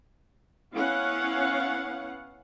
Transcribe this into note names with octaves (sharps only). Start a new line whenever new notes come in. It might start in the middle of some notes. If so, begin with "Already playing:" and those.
B3 C#4 E4 F5 F#5